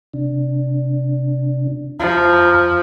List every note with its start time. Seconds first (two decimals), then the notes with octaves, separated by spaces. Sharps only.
0.14 C3 D4
1.99 F2 F3 A#5